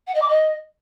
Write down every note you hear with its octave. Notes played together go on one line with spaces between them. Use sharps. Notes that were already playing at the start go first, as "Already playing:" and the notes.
F#5
D#5
D6
D#5